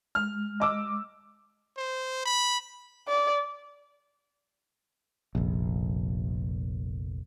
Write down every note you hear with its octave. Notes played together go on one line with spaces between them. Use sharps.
G#3 F6
D#5 D6 E6
C5
B5
D5
F1 A#1